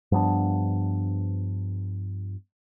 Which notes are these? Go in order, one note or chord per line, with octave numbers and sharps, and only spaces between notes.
G2 F3 B3 D4